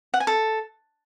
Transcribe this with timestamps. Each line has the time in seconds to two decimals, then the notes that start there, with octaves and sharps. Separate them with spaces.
0.14 F#5
0.20 G#5
0.27 A4